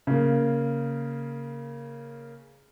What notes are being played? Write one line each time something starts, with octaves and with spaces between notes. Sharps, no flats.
C#3 A#3